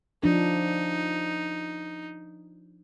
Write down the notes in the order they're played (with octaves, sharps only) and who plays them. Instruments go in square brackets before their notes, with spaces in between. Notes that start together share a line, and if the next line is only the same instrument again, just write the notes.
[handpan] F3 D4 [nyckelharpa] D#4